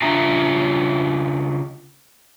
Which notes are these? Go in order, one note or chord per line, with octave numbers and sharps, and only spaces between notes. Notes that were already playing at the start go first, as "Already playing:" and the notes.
C#3 D4 F4 E5 A#5